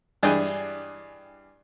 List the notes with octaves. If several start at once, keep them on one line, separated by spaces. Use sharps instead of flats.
G2 E3 D4 G#4 D#5 G5